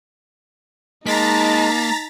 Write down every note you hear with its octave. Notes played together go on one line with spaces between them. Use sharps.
G#3 A#3 D#4 A5 A#5 A6 B6